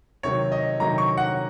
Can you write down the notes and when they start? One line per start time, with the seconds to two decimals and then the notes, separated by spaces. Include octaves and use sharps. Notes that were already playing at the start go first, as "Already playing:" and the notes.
0.23 C3 D#3 F#3 C#5
0.52 D#5
0.80 C3 D#3 F#3 A#5
0.98 C#6
1.17 F#5